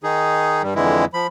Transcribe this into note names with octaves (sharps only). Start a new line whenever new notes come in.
D#3 D#4 G#4
G2 G3
F2 D3 E3 G#3 E4
F3 B5